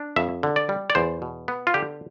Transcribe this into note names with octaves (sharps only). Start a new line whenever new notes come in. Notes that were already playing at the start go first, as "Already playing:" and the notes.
Already playing: D4
F2 E5
D3
D5
G3
D5
E2 C5
B2
B3
F4
D3 G4